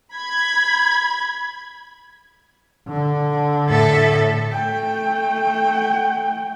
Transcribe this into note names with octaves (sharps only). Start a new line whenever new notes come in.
B5 G#6
D3
A2 A4 E5
A3 G5